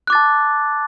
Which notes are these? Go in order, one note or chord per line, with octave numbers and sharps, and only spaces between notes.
A5 D6 F#6 A6